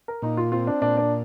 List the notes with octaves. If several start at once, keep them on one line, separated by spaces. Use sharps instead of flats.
A#4
A#2 D#4
F4
C4 F4
D4
A#2 D4
D4